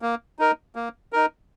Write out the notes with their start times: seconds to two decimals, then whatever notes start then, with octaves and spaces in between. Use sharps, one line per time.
0.02 A#3
0.39 D#4 A#4
0.76 A#3
1.13 D#4 A#4